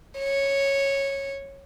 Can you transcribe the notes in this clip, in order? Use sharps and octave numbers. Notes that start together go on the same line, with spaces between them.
C#5